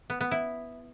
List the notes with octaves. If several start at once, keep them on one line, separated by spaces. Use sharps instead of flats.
B3
B3
E4